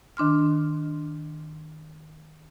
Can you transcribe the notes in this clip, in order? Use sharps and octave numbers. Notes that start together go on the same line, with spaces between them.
D#3 D4 C6 F6